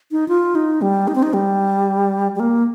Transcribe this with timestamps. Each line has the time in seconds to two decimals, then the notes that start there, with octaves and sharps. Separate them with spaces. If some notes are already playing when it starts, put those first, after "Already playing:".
0.12 D#4
0.29 F4
0.55 D#4
0.82 G3
1.08 D#4
1.15 C4
1.23 D#4
1.33 G3
2.36 G3
2.40 A#3